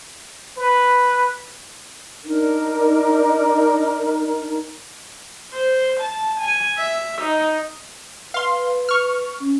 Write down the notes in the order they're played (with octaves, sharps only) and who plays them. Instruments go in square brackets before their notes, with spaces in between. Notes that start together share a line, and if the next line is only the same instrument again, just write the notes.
[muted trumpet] B4
[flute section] D4 D#4 A#4
[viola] C5
A5
G#5
E5
D#4
[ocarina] B4 [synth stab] F5 C6
[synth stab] C#6 F6
[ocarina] C#4